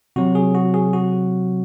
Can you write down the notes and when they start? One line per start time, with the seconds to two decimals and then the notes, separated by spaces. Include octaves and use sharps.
0.16 C3 F#3 F#4
0.35 G#4
0.55 F#4
0.74 G#4
0.93 F#4